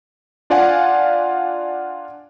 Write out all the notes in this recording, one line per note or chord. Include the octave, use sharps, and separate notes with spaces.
D4 F4 D5 F5 F#5 G#5